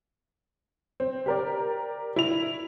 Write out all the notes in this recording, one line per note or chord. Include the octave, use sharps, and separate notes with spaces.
C4
G4 A#4 D5
E4 F7